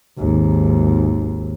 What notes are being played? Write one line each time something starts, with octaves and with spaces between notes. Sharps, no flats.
G#1 D#2